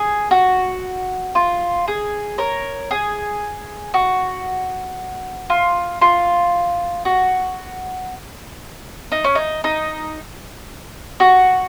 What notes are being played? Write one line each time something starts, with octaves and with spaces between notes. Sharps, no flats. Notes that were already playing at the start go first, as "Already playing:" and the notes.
Already playing: G#4
F#4
F4
G#4
A#4 C#5
G#4
F#4
F4
F4
F#4
D#4
C#4
D#4
D#4
F#4